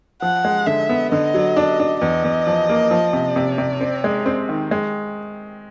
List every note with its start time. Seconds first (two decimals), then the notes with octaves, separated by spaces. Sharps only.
0.22 F3 F#5
0.45 G#3
0.67 D3 E5
0.89 B3
1.12 D3 D#5
1.34 F#3
1.57 D4
1.80 D4
2.01 E2 D#5
2.24 E2
2.47 F3
2.69 A#3
2.91 F3
3.13 C3
3.36 C3 D5
3.58 C3
3.81 C4
4.04 G#3
4.26 C4
4.49 D#3
4.71 G#3